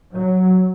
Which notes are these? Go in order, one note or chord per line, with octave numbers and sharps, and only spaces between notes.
F#3